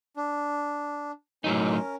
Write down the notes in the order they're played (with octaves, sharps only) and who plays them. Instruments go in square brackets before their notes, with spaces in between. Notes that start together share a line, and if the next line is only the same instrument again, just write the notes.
[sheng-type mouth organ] D4
[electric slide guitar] A2 F#3 D#4 [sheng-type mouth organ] C#4 A#4